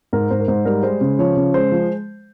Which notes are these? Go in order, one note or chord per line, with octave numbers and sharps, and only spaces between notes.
G#2 A#4
G#2 C5
A#4
G#2 C5
G3 A#4
G#3 C5
C#3
F3 C#5
C#3
G#3 C5
F3